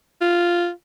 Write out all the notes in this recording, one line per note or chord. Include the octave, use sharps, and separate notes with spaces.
F4